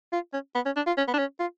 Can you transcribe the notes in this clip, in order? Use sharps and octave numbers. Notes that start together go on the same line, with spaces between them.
F4
C#4
B3
C#4
D4
F4
C#4
B3
D4
C#4
F4